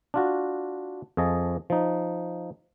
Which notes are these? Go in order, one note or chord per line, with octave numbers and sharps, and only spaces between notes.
D4 F4 F#4
F2 F3 G#4 D#5 A5
F3 D#4